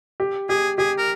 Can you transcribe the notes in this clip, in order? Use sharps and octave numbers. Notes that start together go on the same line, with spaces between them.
G4
G4 G#4
G4 G#4
A#4